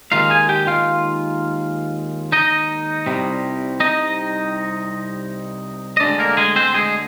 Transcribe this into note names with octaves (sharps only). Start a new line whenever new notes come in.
D#2 D#3 G#3 D#4 F4 F5
G#4 G#5
G4 G5
F4 F5
D#4 D#5
C2 C3 G3
D#4 D#5
D#5
D2 D3 G#3 D4 D5
A#3 A#4
G#3 G#4
C4 C5
G#3 G#4